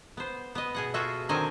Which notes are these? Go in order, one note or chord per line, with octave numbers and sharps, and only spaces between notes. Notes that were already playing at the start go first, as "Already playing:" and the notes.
B3 C5
B3 D#5
B2 G#4 F#5
F4 F#4 G#4 A4 E5
D3 D#3 F#3 C4 D#5 G#5